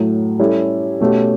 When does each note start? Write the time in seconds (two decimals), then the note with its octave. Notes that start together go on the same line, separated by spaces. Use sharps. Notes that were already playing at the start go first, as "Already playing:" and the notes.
Already playing: A2 F#3 A3
0.39 G3 C#4 E4 A4
1.01 B2 A3 C#4 G4